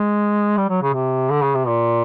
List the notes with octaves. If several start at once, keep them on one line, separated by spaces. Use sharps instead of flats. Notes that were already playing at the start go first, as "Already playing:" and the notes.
Already playing: G#3
G3
F#3
C#3
C3
D3
C#3
C3
A#2